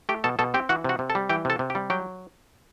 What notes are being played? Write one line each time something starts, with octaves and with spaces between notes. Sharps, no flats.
A3 G4 G5
B2 A4 A5
B2 A4 A5
C4 G4 G5
E3 F#4 F#5
C3 F#4 F#5
C3
A4 A5
G3
E3 G4 G5
C3 A4 A5
C3
G4 G5
G3
F#3 G4 G5